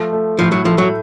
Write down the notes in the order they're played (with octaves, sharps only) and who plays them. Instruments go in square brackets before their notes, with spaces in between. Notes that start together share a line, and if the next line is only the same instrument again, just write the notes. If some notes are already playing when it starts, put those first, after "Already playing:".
Already playing: [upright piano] F3 A3
A3
[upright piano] A2 [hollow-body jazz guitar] F3
[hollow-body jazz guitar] F#3
[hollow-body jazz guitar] F3 [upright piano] A3
[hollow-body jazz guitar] F#3